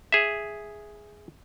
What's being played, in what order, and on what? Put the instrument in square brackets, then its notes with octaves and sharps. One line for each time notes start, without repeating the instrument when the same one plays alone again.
[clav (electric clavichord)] G#4 E5